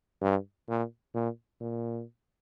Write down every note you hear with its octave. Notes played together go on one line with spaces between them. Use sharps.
G2
A#2
A#2
A#2